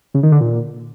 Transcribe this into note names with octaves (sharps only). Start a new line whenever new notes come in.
C#3
D#3
D3
A#2